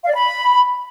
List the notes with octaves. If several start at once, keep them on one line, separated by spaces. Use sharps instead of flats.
F5
D5
B5